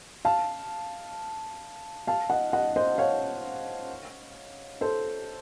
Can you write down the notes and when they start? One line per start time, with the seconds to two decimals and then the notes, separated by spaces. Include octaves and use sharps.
0.25 F5 A5
2.07 F5 A5
2.30 D#5 F#5
2.53 D#5 F#5
2.76 C5 D#5
2.98 C#5 F5
4.81 A4 C5